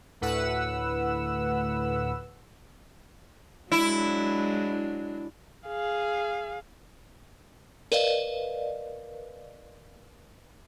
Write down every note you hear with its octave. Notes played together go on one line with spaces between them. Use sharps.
D2 A2 B4 F#5 E6
F#3 G#3 D4 E4
G#4 F5
A#4 B4 D5 D#5 F5